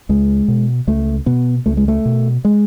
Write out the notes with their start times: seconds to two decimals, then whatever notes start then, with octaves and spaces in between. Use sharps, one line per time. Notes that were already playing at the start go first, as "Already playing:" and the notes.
0.09 C#2 G#3
0.48 B2
0.87 C#2 A3
1.26 B2 B3
1.66 C#2 A3
1.77 G#3
1.88 A3
2.05 B2
2.45 G#3